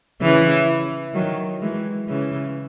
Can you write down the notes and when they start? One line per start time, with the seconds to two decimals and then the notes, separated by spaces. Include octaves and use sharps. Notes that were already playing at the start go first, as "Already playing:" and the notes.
0.21 C#3 E3
1.14 D#3 F#3
1.62 E3 G#3
2.08 C#3 E3